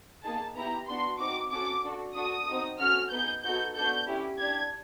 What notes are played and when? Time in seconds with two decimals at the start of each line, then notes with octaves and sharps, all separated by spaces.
0.23 A#3 D#4 G#4 A5
0.55 B3 E4 G4 A#5
0.87 B3 D4 F#4 C6
1.19 C4 D#4 F#4 D6
1.51 C#4 F#4 A4 D6
1.83 D4 F#4 A4
2.15 D4 F#4 A4 D#6
2.47 C4 D#4 F#4
2.79 C#4 F#4 A4 F6
3.11 B3 D#4 G#4 G6
3.43 B3 D#4 F#4 A4 G6
3.75 B3 D4 F#4 A4 G6
4.07 C#4 E4 G4
4.39 D4 G4 G#6